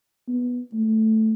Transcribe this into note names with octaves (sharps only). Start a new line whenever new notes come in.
B3
A3